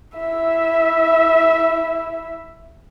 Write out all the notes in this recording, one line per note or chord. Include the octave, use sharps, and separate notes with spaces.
E4 E5